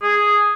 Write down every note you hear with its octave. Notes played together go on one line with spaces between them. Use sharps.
G#4